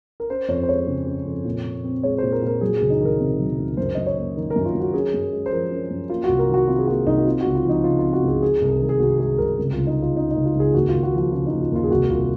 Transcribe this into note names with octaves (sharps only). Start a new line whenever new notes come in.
A#4
C#4 C5
F2 C#5
C5
G#3 C#5
C#3
C#4
F2
A#2
A#2
C4
G#3 C#5
A#2 C5
A#4
A#2 A#4
F#3 G#4
C#2 G#4
D#4
D#3 A#4
C3
F#3
C#2
F#2 C5
F#2 D#5
C#5
A#3
D#3
A#4
F#2
F4
F#2
F#4
C#4 G#4
F#2
G#3
C5
F3 A#4
C#4
F#2
A#3 F4
C2 F#4
A#4
D#3
F#4
C3 F4
G#4
A#3 F#4
C2 D#4
F#4
C4 F4
C#2 F#4
F4
F3 D#4
C#3 F4
C4 F4
F#4
C#2 G#4
G#3 G#4
C2
D#3 A#4
G#4
C3 F#4
G#3 G#4
C2 A#4
C#2
C#2 F4
D#4
G#3
F4
C#3 D#4
C#2 D#4
F4
C#2
G#4
D#2 F#4
D#2 F4
F#4
F3 F#4
C#3 F4
D#4
D#2
F4
D#2 F4
G#4
C2 F#4
C2 F4